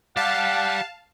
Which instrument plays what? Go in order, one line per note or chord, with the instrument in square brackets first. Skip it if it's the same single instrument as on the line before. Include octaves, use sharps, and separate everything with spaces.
[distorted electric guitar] G4 D5 [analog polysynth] F5 A5 [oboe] F#5